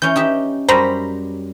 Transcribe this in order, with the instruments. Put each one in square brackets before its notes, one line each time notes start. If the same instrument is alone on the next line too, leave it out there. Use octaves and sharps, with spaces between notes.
[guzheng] E3 C#4 [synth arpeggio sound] G6
[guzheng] D#4 G4 E5
[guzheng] F#2 G3 [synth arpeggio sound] C5 A#5 B5